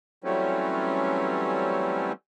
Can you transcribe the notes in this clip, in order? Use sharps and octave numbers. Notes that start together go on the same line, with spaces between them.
E3 F#3 G3 A3 C4 C#4